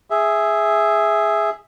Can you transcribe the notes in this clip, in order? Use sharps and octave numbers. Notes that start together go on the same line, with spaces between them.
G#4 E5